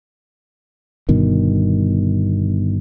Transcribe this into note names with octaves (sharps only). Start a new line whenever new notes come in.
G1 G2 B2 D#3